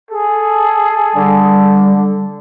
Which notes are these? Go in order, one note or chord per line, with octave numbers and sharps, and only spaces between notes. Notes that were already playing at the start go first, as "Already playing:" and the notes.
G#4 A4
D3 G3